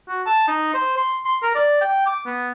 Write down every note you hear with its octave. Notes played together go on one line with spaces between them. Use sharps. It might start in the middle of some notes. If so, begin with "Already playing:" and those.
F#4
A5
D#4
C5
C6
C6
A#4
D5
G5
D6
B3